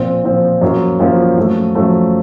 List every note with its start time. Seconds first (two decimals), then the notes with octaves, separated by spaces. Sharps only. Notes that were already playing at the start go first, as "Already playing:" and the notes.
Already playing: A#2 F3 C4
0.24 A#2 F3 C4
0.61 F#2 F3 A#3 F4
1.00 F#2 F3 A#3 F4
1.37 F#2 F3 A3
1.75 F#2 F3 A3